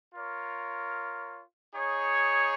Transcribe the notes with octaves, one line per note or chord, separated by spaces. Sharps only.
F4 A#4 C#5
D#4 G#4 C#5